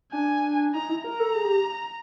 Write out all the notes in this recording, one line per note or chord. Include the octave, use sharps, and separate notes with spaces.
D4 G#5
D#4 A#5
E4
A#4 A#5
A4
G#4
G4